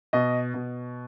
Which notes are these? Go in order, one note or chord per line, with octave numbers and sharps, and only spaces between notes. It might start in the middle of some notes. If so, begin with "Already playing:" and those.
B2 D#5
B2